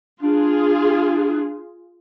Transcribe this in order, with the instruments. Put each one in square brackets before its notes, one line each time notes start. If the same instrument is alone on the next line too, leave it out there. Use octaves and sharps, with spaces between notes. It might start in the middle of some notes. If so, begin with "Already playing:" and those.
[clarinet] D4 [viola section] F4 G#4